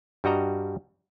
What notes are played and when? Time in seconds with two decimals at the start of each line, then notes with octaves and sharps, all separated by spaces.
0.24 G2 G3 F#4 D#5 A#5